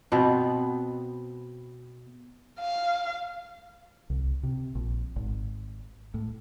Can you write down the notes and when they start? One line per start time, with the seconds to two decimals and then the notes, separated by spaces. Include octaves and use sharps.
0.12 B2 B3 C4
2.59 F5
4.10 C2
4.43 C3
4.75 A#1
5.16 G#1
6.14 A2